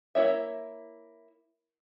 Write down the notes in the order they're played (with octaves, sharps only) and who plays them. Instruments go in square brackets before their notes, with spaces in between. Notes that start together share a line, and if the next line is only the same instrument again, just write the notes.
[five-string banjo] A#3 E4 C#5 E5